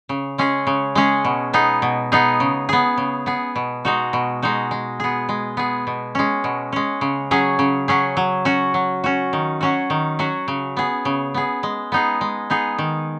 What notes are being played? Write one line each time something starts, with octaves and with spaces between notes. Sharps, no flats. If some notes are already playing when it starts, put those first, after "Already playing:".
C#3
G#3 C#4 G#4
C#3
G#3 C#4 G#4
B2
B3 D#4 G#4
B2
B3 D#4 G#4
C#3
B3 G#4
C#3
B3 G#4
B2
G#3 D#4 F#4
B2
G#3 D#4 F#4
G#3
B3 G#4
G#3
B3 G#4
B2
G#3 C#4
B2
G#3 C#4
C#3
F#3 C#4 G#4
C#3
F#3 C#4 G#4
F#3
C#4 F#4
F#3
C#4 F#4
D#3
F#3 C#4 F#4
D#3
F#3 C#4 F#4
C#3
B3 G#4
C#3
B3 G#4
G#3
B3 D#4 G#4
G#3
B3 D#4 G#4
D#3